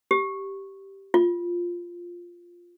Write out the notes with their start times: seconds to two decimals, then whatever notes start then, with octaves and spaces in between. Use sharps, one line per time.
0.11 G4
1.14 F4